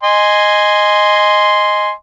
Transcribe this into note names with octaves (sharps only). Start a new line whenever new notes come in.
D#5 G#5 C6